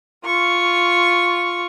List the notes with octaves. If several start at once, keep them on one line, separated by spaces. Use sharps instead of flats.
F4 C#6